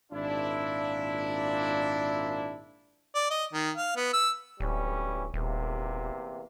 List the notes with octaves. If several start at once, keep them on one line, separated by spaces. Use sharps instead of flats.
G#1 A#2 D4 E4
D5
D#5
D#3
F5
B3
E6
D1 E3 G3 C#4
D#1 E2 C3 A#3